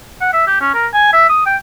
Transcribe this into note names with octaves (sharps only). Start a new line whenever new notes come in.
F#5
E5
G4
C#4
A#4
G#5
E5
D#6
G5